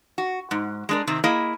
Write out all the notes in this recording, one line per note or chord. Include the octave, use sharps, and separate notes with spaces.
F#4
G#2
G#3 D4 A#4
C3 D#3 C4
A#3 E4 G#4 D#5